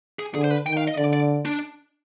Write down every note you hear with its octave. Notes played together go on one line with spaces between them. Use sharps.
G#4
D3 G#4
C5
B4
D#3 G5
F5
D#5
D3 D5
D5
D4